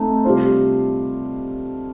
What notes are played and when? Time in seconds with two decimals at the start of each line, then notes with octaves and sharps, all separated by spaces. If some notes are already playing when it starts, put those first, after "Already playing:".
Already playing: A3 C4 D#4
0.25 C3 G3 D4 F4 C5